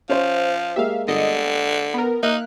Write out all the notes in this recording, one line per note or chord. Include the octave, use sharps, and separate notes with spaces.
F3 C#4 C5
G#3 A#3 G4 E5 F5
G1 D3 D#5 C#7
B3 A#4
A#3 D#4 E5 F6 F#6